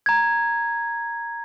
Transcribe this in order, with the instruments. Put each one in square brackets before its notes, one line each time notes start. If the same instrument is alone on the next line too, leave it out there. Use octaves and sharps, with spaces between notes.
[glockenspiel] A#5 G#6